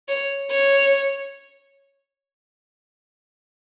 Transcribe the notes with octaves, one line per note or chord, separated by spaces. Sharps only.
C#5
C#5